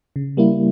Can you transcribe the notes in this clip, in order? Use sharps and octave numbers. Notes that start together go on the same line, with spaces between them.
C#3
G3 A#3 E4